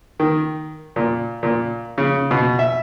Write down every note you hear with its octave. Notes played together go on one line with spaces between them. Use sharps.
D#3
A#2
A#2
C#3
B2
E5